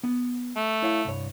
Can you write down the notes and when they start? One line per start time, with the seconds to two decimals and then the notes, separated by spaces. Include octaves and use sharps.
0.03 B3
0.56 A3
0.82 E4 C#5 F5
1.05 C2 G2 C#5